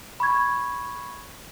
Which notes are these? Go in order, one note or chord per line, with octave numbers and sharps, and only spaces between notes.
B5 C#6 G#6